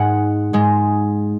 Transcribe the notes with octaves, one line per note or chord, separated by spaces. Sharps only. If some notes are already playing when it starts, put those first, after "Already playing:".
Already playing: G#2 G#3 F#5
G#2 G#3